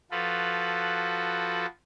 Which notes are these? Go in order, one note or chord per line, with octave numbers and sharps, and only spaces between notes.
F3 F4 F#4 A4 B4